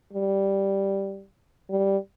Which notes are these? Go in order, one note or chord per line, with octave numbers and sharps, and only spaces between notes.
G3
G3